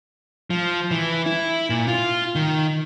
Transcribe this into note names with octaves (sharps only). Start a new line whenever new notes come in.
F3
E3
E4
A#2
F4
D#3